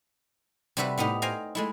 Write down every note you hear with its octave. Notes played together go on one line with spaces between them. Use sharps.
C3 G3 F#4 B4 E5 F#5
A2 B3 D#4 G4
C5 F5 G5 G#5 A#5
G#3 A3 E4